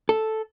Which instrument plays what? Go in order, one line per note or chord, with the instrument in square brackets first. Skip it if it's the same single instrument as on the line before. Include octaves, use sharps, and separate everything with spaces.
[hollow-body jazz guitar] A4